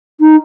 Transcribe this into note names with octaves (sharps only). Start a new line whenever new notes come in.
D#4